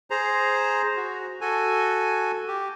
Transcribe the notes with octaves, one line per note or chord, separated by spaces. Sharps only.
G#4 C5 A#5
F#4
F#4 A4 G#5
G4